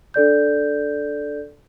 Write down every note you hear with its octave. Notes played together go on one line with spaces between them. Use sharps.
D4 A4 D5 G6